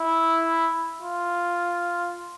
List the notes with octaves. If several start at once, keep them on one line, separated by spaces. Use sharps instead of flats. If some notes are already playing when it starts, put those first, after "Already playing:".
Already playing: E4
F4